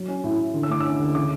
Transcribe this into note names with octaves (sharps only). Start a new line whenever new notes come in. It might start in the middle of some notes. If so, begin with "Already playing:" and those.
Already playing: F#3
C#4
A2
A2
D3
E6
A3 D6
C#4 E6
D2
C#3 D6